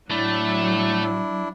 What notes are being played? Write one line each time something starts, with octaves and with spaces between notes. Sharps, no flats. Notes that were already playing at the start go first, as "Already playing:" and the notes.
A2 F#3 A3 D4 E4